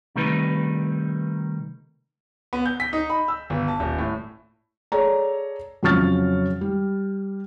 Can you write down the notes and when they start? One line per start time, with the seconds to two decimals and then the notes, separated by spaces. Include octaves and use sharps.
0.16 C3 D#3 G3 A3 D#4 B4
2.53 B3
2.66 G6
2.80 B6
2.93 D#4
3.10 B5
3.28 E6
3.50 G1
3.68 A5
3.80 D#1
3.98 A2
4.92 G#4 A4 C#5 D5 A#5
5.83 F2 C#3 F#3 C#6 F6 A6
6.61 G3